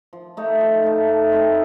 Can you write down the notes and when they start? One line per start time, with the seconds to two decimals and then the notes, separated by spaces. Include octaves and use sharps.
0.13 F3
0.37 A3 D#4
0.61 F3
0.84 A3 D#4
1.08 A3
1.32 C4 D#4 A4